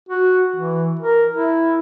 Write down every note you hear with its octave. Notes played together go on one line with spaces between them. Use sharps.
F#4
E3
A#4
E4